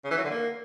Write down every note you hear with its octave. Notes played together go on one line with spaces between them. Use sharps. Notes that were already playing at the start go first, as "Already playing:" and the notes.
C#3
E3
F#3
D3
A#3